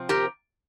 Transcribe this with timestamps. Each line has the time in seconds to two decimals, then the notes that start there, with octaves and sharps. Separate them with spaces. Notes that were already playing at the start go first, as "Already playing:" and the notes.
Already playing: C3 F3 C4
0.09 G4 A#4